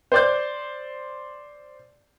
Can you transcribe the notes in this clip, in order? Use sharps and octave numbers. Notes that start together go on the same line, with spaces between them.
C5 D5 G6